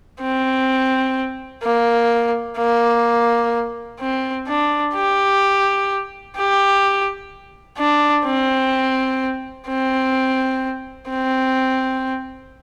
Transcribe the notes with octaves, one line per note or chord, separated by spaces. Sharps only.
C4
A#3
A#3
C4
D4
G4
G4
D4
C4
C4
C4